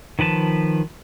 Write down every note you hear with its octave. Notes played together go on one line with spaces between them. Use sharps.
D#3 F3 B4 A5